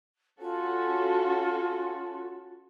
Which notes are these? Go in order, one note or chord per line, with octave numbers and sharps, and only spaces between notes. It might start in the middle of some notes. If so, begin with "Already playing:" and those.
C#4 F4 F#4 A4